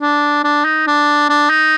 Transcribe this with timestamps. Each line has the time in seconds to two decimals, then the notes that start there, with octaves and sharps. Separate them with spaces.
0.02 D4
0.44 D4
0.65 D#4
0.87 D4
1.29 D4
1.50 D#4